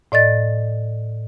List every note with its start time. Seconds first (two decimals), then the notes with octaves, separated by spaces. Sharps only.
0.12 A2 D5 D#5 A6